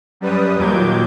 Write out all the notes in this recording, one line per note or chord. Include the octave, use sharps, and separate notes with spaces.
F#2 G3 B4 D#6
D#2 A#2 F#3 D6 G6 G#6